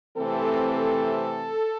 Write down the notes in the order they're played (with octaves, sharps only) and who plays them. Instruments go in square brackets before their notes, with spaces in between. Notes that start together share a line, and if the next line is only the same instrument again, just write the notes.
[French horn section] C3 E3 A3 C4 A4